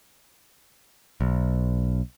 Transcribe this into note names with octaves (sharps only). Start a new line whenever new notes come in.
B1